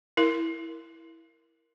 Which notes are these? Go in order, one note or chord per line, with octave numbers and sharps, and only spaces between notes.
E4 A#4